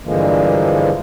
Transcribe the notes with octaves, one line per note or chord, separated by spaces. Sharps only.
G2 D3 E3 F3 G#3 A#3